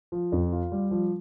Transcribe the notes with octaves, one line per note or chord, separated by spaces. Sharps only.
F3
F2
F4
G3
F3